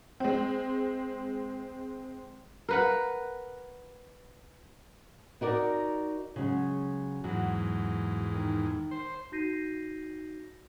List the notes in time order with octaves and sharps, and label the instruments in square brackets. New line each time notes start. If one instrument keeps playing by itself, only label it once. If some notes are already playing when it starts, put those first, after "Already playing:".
[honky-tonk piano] G#3 C4
[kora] A#4 B4 F#5
[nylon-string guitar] D#4 F#4 A#4 D5
C#3 F#3 G#3
[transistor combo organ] E2 G#2 [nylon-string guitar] F#3
[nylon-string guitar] D#3
[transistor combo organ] C5
[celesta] D#4 F#4 G6 A#6 C7 D#7